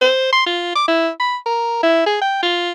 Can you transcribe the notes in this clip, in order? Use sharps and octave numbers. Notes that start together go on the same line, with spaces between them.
C5
C6
F4
D6
E4
B5
A#4
E4
G#4
G5
F4